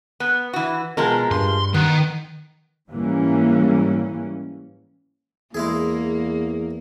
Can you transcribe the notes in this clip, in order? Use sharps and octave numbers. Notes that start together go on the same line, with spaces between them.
B3
E3 F#4
B2 F3 G#3 A#4
G2 C6
D#3 B3
G#2 E3 G3 A#3 C#4
E2 G#3 A#3 E4 G#4